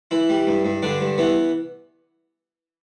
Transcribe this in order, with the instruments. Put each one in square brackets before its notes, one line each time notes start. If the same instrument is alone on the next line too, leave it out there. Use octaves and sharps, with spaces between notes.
[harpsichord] E3 E4
G3
G2
G2
G2 D3 D4
G2
E3 B3